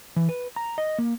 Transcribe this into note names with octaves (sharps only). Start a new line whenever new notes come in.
E3
B4
A#5
D#5
A#3